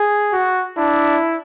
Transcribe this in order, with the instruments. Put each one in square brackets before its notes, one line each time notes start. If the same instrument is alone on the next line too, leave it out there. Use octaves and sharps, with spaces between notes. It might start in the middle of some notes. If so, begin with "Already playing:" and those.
Already playing: [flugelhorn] G#4
[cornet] F#4
[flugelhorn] D4 [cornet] E4